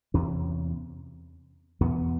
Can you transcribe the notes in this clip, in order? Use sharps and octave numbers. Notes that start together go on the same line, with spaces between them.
E2 C3 C#4
E2 B2 B3